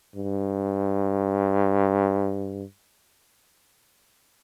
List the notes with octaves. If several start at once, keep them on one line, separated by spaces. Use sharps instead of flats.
G2